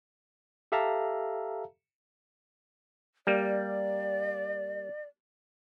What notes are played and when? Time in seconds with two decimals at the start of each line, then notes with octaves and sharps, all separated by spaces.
0.72 G4 A4 E5 F5 A5 A#5
3.27 G3 A#3 D5